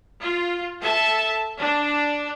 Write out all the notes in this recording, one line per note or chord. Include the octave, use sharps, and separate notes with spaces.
F4
A4 E5 A5
D4